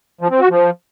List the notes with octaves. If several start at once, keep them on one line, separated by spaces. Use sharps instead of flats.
F3
C4
F#4
F3